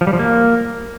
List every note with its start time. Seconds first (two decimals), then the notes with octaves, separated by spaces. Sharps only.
0.01 F3
0.07 G3
0.13 F3
0.19 A#3